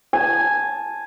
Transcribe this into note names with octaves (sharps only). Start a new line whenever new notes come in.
G#5 A5